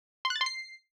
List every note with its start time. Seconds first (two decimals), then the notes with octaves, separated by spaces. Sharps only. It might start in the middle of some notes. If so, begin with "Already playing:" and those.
0.25 C6
0.30 F#6
0.36 A6
0.41 C6
0.46 C7